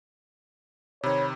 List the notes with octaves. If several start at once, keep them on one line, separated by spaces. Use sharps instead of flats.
C3 D#3 C#5 B5